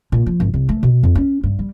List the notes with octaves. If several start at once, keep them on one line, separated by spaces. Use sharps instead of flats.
A#2
F3
G#1
C2
A3
B2
F2
C#4
G2
G3